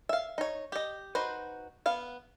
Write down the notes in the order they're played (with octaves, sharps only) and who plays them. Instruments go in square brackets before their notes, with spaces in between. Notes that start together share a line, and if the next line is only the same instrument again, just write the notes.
[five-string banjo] E5 F5
D#4 C#5
G4 D#5
D#4 F#4 B4 C5
B3 F5